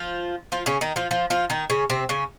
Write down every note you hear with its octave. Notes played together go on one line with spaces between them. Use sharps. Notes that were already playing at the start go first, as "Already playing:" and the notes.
Already playing: F3 F4
F3 F4
C#3 C#4
D#3 D#4
F3 F4
F3 F4
F3 F4
D#3 D#4
C#3 C#4
C3 C4
C#3 C#4